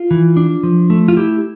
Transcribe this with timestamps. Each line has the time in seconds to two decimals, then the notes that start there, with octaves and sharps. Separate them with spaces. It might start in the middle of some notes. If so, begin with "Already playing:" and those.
Already playing: F4
0.11 E3
0.37 D4
0.63 F3
0.90 A3
1.08 F4
1.17 E4 G4